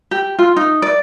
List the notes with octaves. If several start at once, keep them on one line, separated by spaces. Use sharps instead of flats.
G4
F4
D#4
D5